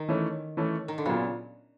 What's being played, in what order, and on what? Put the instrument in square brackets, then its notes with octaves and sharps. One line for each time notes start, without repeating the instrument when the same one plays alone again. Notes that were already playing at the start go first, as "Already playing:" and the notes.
Already playing: [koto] D#3
[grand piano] E3 A3 C#4
E3 A3 C#4
[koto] D#3
D3
[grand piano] A#2 F#3 B3 [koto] C#3